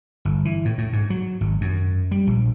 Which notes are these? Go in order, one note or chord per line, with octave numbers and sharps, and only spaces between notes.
G1
E3
A2
A2
G#2
F#3
G#1
F#2
G3
A#1